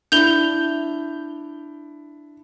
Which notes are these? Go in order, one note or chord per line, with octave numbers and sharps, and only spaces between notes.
D4 E4 G6 F7 G7